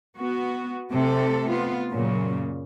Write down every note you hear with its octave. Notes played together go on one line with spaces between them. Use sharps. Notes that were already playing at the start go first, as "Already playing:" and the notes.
B3 F#4
C3 A3 C4 A4
B3 F4
F#2 A#2 C#3